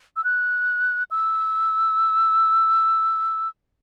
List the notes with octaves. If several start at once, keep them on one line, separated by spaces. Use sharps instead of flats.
E6
F#6
E6